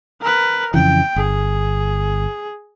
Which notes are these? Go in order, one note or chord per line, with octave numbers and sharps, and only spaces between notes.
A#4 B4
F2 C#3 E3 G5
G1 G#4